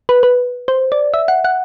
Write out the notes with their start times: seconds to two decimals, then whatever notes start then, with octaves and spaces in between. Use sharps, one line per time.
0.09 B4
0.23 B4
0.68 C5
0.92 D5
1.14 E5
1.28 F#5
1.44 F#5